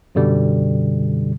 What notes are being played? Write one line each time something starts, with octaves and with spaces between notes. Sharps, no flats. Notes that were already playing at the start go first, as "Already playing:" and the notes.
F#2 B2 D3 G3